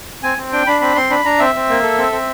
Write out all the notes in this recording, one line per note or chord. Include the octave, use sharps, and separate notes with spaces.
C4 G#5
C4
D4 G5
D4 B5
C4 B5
C4 C6
D4 B5
D4 A#5
C4 E5
C4
A#3
A4
C4
C4